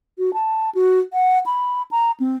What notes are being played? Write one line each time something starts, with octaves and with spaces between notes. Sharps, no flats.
F#4
A5
F#4
F#5
B5
A#5
C4